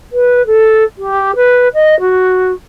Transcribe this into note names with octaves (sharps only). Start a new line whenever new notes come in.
B4
A4
G4
B4
D#5
F#4